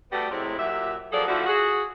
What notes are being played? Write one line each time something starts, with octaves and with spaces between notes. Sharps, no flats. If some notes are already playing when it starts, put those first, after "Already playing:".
G3 A3 B3 F#4 G4
A2 C3 F#3 G#3 C4 E4
A#2 F#3 G4 E5
F3 F#3 A#3 G#4 A4 D5
D3 F3 A3 E4 F#4
F#4 G#4